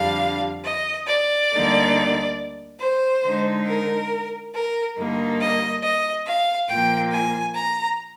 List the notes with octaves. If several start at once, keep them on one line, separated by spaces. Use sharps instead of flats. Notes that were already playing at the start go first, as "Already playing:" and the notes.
Already playing: F2 D3 G3 D4 F5
D#5
D5
D2 D3 G3 A#3 D#4
C5
D3 G#3 D#4
A#4
A#4
G2 D3 G3 A#3 D#4
D#5
D#5
F5
A#2 F3 A#3 G5
G#5
A#5